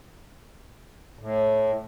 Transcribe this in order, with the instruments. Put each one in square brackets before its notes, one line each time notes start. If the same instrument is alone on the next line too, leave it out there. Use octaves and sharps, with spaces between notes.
[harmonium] A2